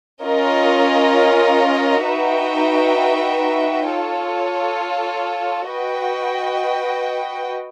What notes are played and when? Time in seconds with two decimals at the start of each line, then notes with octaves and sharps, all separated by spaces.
0.22 C#4 F4 A#4 D#5
2.03 D#4 F#4 B4 E5 G5
3.86 F4 A4 C#5
5.69 F#4 B4 D#5 G5